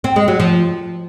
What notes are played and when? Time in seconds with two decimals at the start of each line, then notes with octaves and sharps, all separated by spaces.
0.04 C4
0.16 G#3
0.28 F#3
0.40 F3